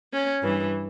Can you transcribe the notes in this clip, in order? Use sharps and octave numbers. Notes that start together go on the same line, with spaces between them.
C#4
G2 E3